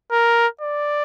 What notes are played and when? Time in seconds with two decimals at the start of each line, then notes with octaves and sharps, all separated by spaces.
0.11 A#4
0.61 D5